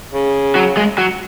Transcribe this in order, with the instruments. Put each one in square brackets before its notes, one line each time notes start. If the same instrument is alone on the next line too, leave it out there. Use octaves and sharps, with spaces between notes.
[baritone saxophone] C#3
[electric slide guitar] F#3 F#4
G#3 G#4
F#3 F#4